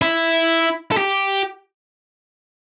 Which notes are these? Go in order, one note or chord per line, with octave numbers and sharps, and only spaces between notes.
E4
A4
G4